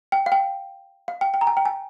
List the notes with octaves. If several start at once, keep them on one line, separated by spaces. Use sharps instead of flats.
G5
F5
G5
F5
G5
G5
A#5
G#5
G5
G#5